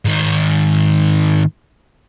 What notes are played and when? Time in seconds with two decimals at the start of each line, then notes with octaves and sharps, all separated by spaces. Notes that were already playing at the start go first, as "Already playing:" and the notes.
0.05 G#2 D#3